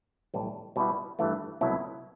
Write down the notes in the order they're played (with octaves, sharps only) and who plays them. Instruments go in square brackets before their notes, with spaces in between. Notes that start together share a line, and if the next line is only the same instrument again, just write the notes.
[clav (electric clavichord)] B1 A2 E3 G3
B2 G3 B3 E4
G2 E3 A3
C2 B2 F#3 A3 E4